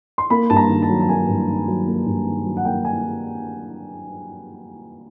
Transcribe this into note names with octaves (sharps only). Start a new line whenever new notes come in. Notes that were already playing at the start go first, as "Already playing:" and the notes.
C6
A#3 B5
G2 A5
A#5
D#3
A5
F#3
A5
A#3 G#5
G2
D#3
F#3
A#3
G2
D#3
F#3
F#5
A#3 G5
G#5